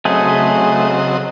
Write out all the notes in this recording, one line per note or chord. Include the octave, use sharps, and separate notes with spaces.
C#3 F#3 A3 C4 G#4 D#5